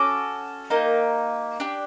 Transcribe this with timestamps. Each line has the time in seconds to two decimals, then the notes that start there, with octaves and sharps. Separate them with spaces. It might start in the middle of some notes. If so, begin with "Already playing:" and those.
Already playing: C#4 F#4 A4 D6
0.70 A#3 D#4 G4
1.60 D4 G4